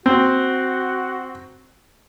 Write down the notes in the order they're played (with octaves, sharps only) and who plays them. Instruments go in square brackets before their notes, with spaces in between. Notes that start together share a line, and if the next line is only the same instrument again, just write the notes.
[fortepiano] C4 [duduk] F#4